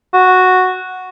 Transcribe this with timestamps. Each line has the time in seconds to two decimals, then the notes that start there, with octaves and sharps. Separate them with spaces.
0.13 F#4